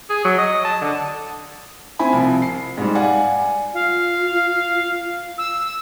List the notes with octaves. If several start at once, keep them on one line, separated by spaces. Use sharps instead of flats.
G#4
F#3
D#5
A5
D3
C4 E4 G#5 B5
C2 F3
C7
G#2 G3
D5 F5 F#5 G#5
F4 F5
E6